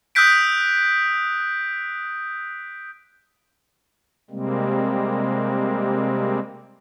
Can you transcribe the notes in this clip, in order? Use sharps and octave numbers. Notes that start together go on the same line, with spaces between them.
D#6 E6 F#6 G6 B6 D7
C3 G3 G#3 A#3 C4